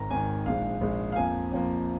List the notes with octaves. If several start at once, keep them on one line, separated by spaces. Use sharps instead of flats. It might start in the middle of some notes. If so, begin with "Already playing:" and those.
Already playing: G#1 G#2 D#3 A#5
G#1 G#2 D#3 G#5
A#1 G#2 G#3 F5
A#1 G#2 G#3
F5
F2 F3 A#3 G#5
F2 F3 A#3